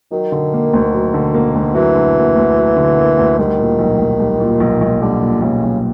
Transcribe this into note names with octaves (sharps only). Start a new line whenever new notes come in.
D#3 F#3
D3
A#3
D2
F#3
D3
A#3
D2
E3 F#3
D3
A#3
D2
F#3
D3
A#3
D2
D#3 G3
A#2
B1
B1
G3
A#2
B1
B1
D3 G3
A#2
B1 C#3
B1